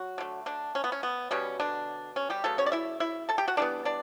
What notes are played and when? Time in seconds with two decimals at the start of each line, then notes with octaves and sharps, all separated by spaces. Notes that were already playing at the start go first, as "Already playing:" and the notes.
Already playing: F#3 F#4
0.18 D3 A3
0.46 D3 D4
0.75 C#4
0.84 B3
0.92 C#4
1.03 B3
1.31 B2 G3 B3 C#4
1.60 D3 D4
2.16 C#4
2.30 G3 G4
2.44 C#3 F#3 A3 B3 A4
2.58 C#4 C#5
2.66 D5
2.72 E4 E5
3.00 E4 E5
3.29 A4 A5
3.38 G4 G5
3.48 F#4 F#5
3.57 E3 G3 B3 D4 D5
3.85 D4 D5